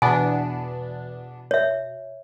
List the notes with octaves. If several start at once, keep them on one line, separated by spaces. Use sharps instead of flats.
E2 B2 B3 D4 G#5
C#5 E5